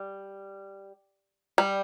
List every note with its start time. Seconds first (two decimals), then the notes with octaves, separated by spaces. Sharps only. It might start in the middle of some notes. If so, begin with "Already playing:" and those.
Already playing: G3
1.58 G3